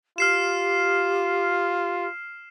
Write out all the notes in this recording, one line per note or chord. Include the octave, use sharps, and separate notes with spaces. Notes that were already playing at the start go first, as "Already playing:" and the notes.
F4 G4 F6 C7 E7